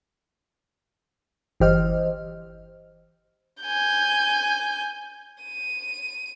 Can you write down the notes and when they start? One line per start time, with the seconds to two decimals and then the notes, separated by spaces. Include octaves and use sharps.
1.60 G1 E3 G4 C5 D#5 F6
3.62 G#5 G6
5.43 D#7